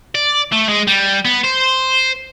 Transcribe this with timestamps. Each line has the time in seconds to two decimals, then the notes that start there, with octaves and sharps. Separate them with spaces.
0.15 D5
0.52 A3
0.69 G#3
0.87 G3
1.25 B3
1.44 C5